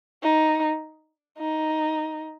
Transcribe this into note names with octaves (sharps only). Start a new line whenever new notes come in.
D#4
D#4